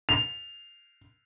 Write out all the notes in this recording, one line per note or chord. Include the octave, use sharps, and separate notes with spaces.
F7